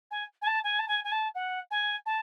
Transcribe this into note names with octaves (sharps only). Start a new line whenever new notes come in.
G#5
G#5
A5
G#5
A5
G#5
G#5
A5
F#5
G#5
A5